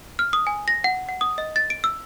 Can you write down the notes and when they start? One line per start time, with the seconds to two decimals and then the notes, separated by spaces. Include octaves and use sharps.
0.19 F6
0.33 D#6
0.47 G#5
0.68 A#6
0.84 F#5
1.09 F#5
1.21 D#6
1.38 D#5
1.56 A6
1.70 D7
1.84 E6